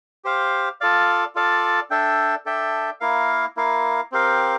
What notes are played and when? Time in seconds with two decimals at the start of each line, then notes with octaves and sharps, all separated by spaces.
0.25 G4 C5 F5
0.81 F4 A4 D5 F5
1.35 F4 A4 D5 F5
1.90 D4 A4 E5 G5
2.46 D4 A4 E5 G5
3.01 A#3 E4 A#4 F5
3.57 A#3 E4 A#4 F5
4.12 C4 G4 A#4 F5